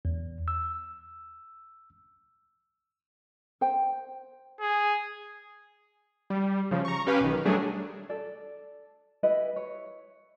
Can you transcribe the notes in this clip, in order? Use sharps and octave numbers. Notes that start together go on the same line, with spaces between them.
E2
E6
C5 G5
G#4
G3
C#3 F3
A#5 C#6
C#4 G4 B4 F5 B5
B1 D#3
F#3 G3 A3 D4 G#4
A4 D5
E4 G4 B4 D#5
C#5